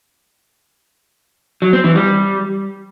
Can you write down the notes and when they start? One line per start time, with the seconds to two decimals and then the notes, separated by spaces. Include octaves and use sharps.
1.62 F#3
1.73 C4
1.84 E3
1.95 G3